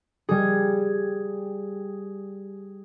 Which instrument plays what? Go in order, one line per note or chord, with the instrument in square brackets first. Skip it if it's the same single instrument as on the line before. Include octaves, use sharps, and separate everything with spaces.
[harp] G3 G#4